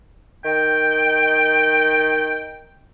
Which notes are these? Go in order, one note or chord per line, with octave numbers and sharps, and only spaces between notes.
D#3 G5